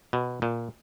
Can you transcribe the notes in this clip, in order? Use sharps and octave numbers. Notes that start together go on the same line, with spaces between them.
B2
A#2